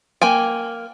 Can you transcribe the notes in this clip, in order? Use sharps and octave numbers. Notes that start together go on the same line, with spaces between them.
A#3 G5 G#5